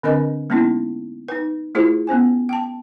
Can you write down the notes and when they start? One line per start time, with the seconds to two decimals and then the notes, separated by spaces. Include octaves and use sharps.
0.03 D3 C4 D4 A#4 B4 D#5
0.50 G#3 A#3 B3 C#4 D#4 E4
1.28 D#4 B4
1.75 A3 E4 F4 G#4 C5
2.07 B3 C#4 C5 G#5
2.49 G5 A5